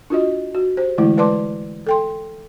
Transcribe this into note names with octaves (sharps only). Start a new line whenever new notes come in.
D4 F4 F#4 D#5
F#4
G4 C5
D3 E3 G#3 A3 E4
G#3 B4 D5 A5 C6 D6
A4 G5 C6